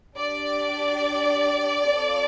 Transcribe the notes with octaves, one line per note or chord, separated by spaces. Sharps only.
D4 G4 D5
C4 F4 A4